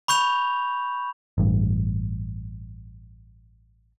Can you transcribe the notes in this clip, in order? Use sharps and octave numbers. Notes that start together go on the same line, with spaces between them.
B5 C#6 G6 F7
A1 G2